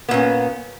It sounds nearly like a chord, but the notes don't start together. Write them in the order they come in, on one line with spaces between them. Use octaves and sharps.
B3 A#2 C#4